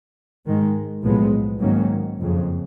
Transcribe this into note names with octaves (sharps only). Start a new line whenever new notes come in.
G#2 D#3 G#3
B1 A2 F3 G#3 B3
G#2 D#3 F#3 A#3 C#4
F#1 F2 C#3